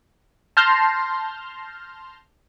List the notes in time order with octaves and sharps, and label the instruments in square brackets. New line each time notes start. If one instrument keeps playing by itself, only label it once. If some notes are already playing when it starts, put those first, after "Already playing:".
[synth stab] A5 C6 F6 G6 A#6